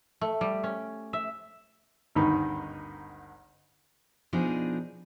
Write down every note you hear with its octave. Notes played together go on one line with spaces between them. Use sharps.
A3
G3
C#4
E5
G#1 D2 G2 D#3 D#4 B5
B2 F3 D4 D#4 G#4